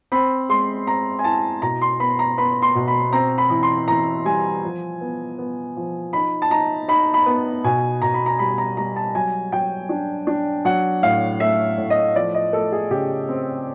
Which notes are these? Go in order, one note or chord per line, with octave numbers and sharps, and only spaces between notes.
C4 B5
G#3 C6
C4 A#5
G#5
E4 A5
B2 A#5
C6
B3 B5
A#5
B3 B5
C6
B2
B5
C4 A#5
B5
E3
C6
E3 A#5
G3 G#5
F3
B3
B3
F3
D#4 B5
A5
D#4 A#5
D#4 B5
B5
B3
B2 G#5
B2 A#5
B5
A#5
G3 B5
A#5
G3 A#5
A5
F#3 G#5
F#3 G5
D4
D4
F#3 F#5
A2 F5
A3 E5
A2
D#5
F3 D5
D#5
A3 A4
G#4
C#3 G4
C4